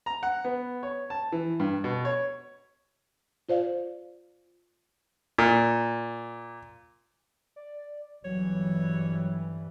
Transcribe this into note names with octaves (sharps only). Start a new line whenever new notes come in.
A#5
F#5
B3
C#5
A5
E3
G2
B2
C#5
F4 C5 D5 F5
A#2
D5
G1 E3 F#3 G3 C#5